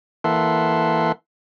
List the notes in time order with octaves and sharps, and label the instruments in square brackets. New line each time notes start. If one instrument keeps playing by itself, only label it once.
[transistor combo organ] E3 A#3 A4 E5 F#5 C6